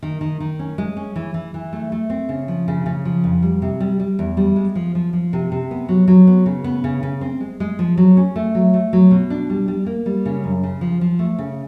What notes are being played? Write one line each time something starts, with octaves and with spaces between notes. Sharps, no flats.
D#3
D#3
D#3
C#4
G#3
C#4
E3
E3
E3
A3
A3
C4
C#3
F3
C#3
C#3
F3
F2
G3
C3
G3
G3
E2
G3
G#3
F3
F3
F3
C3
C3
B3
F#3
F#3
B3
C#3
B3
C#3
C#3
C4
G#3
G#3
F3
F#3
C#4
A3
F#3
A3
F#3
B2
D4
G3
G3
A#3
G3
C#3
F#2
C#3
F3
F3
A3
C#3